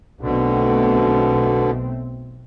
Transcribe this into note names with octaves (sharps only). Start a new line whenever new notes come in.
B1 B2 D3 A3 C4